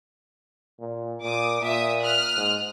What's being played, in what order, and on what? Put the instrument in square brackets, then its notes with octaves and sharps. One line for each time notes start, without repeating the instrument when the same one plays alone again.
[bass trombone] A#2
[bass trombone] A#2 [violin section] D6 D#6
[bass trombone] A#2 [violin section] E5 D#6
[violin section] D#6 F6 F#6
[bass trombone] G#2